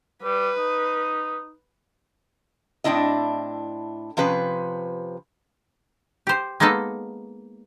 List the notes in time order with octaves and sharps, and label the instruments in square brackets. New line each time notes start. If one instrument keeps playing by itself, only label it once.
[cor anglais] G3 [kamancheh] B4
[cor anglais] D#4
[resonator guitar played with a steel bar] A2 C4 D4 E4 D#5
C3 F3 C#4 B4
[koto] G4 C5
G#3 A#3 B3 D#4 A4